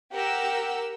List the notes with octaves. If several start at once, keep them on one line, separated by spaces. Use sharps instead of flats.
G4 A#4 F#5 E6